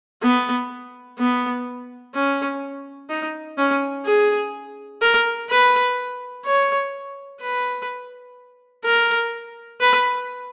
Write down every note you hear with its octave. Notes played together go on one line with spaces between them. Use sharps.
B3
B3
C#4
D#4
C#4
G#4
A#4
B4
C#5
B4
A#4
B4